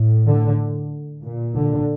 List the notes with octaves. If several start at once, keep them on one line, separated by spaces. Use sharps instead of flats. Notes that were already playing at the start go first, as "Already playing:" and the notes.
Already playing: A2
D3
A#2
D3